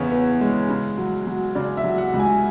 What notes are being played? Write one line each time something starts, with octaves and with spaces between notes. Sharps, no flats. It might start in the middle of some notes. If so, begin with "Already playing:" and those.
Already playing: E2 C#3 B3 C#5
B3
G#3
C#3
F#3
F#3
C#3 D5
E5
F#3
F#5
C#2
G#5